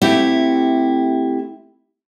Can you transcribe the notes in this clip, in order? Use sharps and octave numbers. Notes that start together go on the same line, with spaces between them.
A3 C4 E4 G4 F#5